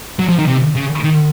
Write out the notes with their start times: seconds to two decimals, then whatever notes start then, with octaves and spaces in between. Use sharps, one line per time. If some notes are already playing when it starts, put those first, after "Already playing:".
0.19 F#3
0.29 F3
0.38 D#3
0.48 C3
0.76 C#3
1.04 D#3